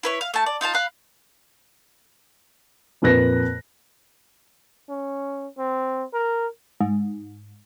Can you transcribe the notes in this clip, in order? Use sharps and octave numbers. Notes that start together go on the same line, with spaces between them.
E4 B4 C#5
F5
A3 A5
D5
D#4 F4 F5 A5
F5 B5 F#6
F2 A#2 B4 F#6 A#6
C#4
C4
A#4
G#2